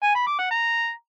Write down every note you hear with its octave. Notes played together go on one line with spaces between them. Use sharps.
G#5
B5
D6
F#5
A#5